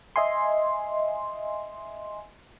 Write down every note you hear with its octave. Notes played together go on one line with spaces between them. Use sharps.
D#5 E5 G#5 C6